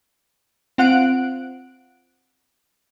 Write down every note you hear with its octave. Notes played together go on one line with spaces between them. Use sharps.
C4 F4 F#5 F#6 D7